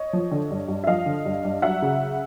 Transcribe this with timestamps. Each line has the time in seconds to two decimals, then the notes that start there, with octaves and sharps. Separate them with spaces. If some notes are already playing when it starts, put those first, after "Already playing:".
Already playing: C#5 D#5
0.13 F3
0.31 D3
0.51 G2
0.68 G2
0.84 E5
0.87 F3 D#5 F5
1.06 D3
1.25 G2
1.45 G2
1.62 F#3 E5 F#5
1.82 C#3